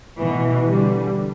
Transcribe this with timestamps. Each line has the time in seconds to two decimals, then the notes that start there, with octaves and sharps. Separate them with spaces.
0.18 B2 E3
0.67 D3 G3